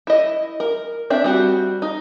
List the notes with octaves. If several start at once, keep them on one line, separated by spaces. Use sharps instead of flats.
E4 D#5
A#4
C4 D4 E5
G3 C4 F#4
D#4